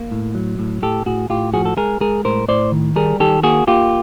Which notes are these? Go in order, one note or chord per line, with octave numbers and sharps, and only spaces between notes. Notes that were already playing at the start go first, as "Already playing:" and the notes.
Already playing: A#3
A2
F#3
A2
A2 G4 A4
A2 F#4 G#4
A2 F4 G4
F3 F#4 G#4
A4
G#3 G#4 A#4
G#3 G#4 A#4
A2 A#4 C5
A2 C5 D5
D#3
G3 G#4 A#4
D#3 G4 A4
A#3 F#4 G#4
A#3 F4 G4